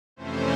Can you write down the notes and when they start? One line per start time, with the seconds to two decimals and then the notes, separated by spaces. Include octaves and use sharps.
0.16 F2 C3 E3 A3 C#4 C5